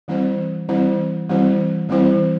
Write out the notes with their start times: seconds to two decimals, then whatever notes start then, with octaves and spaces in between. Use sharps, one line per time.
0.08 E3 G3 C4 E4 C5
0.68 E3 G3 C4 E4 C5
1.29 E3 G3 C4 E4 C5
1.89 E3 G3 C4 E4 C5